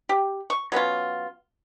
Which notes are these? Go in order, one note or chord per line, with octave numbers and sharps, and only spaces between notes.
G4
C#6
F#3 B3 C#4 F4